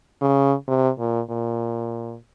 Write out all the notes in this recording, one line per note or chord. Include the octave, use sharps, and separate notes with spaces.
C#3
C3
A#2
A#2